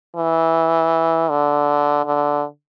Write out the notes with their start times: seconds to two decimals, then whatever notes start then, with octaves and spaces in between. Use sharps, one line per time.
0.16 E3
1.30 D3
2.05 D3